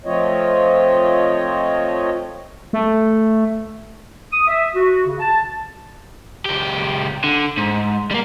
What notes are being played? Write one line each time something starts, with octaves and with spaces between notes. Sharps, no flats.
F3 A3 C4 F4 C#5 D#5
A3
D#6
E5
F#4
C#3
A5
C#2 G4
D3
G#2
G3 A#3